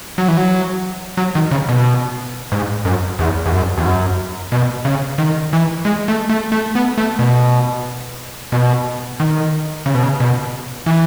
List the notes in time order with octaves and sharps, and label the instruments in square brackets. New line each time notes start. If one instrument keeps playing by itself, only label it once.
[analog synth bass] F#3
E3
F#3
F#3
D#3
C#3
B2
G#2
F#2
E2
E2
F#2
E2
F#2
B2
C#3
D#3
E3
G#3
A3
A3
A3
B3
A3
B2
B2
D#3
C#3
B2
C#3
B2
E3